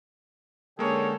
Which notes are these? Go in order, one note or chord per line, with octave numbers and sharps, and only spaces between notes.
D3 G#3 A#3 C#4 G#4 A4 C#5 G5